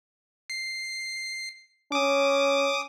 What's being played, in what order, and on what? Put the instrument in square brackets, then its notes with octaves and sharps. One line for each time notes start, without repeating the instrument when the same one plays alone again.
[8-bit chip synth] C7
[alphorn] C#4 [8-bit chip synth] D6 D#6